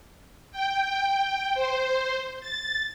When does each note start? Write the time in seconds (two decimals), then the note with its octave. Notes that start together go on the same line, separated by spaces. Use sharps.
0.52 G5
1.55 C5
2.41 A6